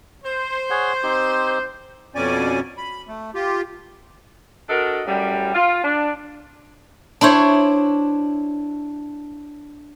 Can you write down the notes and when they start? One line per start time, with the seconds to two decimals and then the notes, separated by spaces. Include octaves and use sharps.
0.24 C5
0.70 G#4 C#5 F#5
1.03 C4 D#4 G4
2.15 F2 B2 C#4 D5 G#5
2.78 B5
3.08 A3
3.34 F4 G4
4.70 D4 F#4 A4 A#4 D#5
5.06 F#2 A2 G3
5.55 F4
5.84 D4
7.21 D4 E4 C5 C#5